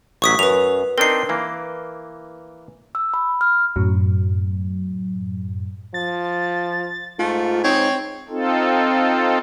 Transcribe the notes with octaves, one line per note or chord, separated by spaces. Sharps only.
A1 F#3 C#6 D#6 B6
F#2 B4 F7
C4 D4 D#4 A#4 C7
E3 A#3
E6
B5
F6
F#2 A2 F#3
F3 A6
G#2 A3 F4
C4 D#4 C#5
C4 D#4 F4 A4